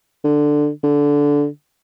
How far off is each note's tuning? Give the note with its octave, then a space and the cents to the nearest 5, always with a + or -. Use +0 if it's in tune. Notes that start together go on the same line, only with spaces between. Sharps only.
D3 +10
D3 -15